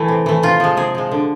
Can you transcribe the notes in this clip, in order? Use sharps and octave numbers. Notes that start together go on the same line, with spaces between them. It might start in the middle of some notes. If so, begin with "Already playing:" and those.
Already playing: E3 A3 E4
C3
E3 A3
C3 F4
F3 G#3
C3 G#4
F3 G#3
D3